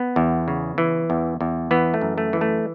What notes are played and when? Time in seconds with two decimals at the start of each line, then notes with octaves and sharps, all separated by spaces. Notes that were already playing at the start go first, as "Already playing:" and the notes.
Already playing: B3
0.16 E2
0.48 C#3
0.78 E3
1.10 E2
1.41 E2
1.71 E3 B3
1.94 A3
2.01 F#2
2.18 A3
2.33 E3
2.41 A3